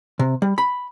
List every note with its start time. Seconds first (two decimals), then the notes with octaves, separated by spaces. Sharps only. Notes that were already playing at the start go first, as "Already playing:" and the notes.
0.19 C3
0.42 G3
0.58 B5